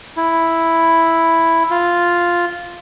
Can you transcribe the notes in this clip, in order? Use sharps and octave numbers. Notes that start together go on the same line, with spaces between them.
E4
F4